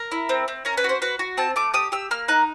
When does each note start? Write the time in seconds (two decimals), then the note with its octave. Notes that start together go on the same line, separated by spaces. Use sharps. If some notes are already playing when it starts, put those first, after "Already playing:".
Already playing: A#4
0.11 E4
0.29 C4
0.48 C4
0.65 C#4 A#4
0.77 B4
0.84 F#4 C5
1.02 F#4 B4
1.19 F#4
1.37 C4 A5
1.56 A3 D6
1.74 G4 D#6
1.92 G4 E6
2.11 A#3 F6
2.28 D#4 F#6